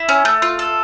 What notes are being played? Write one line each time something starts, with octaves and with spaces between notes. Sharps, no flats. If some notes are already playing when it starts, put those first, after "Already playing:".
Already playing: E4
C#4
A3
F4
A4